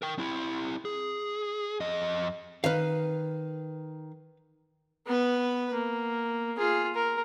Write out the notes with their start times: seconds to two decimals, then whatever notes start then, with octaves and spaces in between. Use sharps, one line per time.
0.02 A#4 G5
0.18 C4 E4
0.85 G#4
1.80 F2 D#5
2.64 D#3 B4 F5
5.06 B3 B4
5.73 A#3
6.57 F4 G#4
6.94 A#4